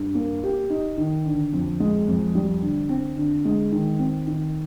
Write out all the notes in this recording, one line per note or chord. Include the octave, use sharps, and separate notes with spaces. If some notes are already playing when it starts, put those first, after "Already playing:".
Already playing: G2
A#3
G4
D#4
D#3
D3
F2
G#3
F2
G3
D3
C4
D3
G#3
D#3
C4
D#3